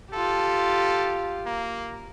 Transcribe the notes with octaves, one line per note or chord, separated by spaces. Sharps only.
F4 G4 A4
A#3